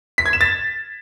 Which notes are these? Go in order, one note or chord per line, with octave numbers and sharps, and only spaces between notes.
B6
G#6
E7
A6